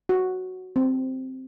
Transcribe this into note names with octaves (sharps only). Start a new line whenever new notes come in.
F#4
C4